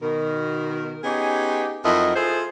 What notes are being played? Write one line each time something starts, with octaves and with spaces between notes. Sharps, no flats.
B2 D#3 A#4
B3 C#4 D#4 G4 G#4
F2 F#3 D#4 E4 A#4 D#5
E4 F4 G#4 A4 C5